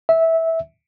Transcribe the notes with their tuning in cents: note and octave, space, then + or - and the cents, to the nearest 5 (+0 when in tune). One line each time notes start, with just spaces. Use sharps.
E5 -15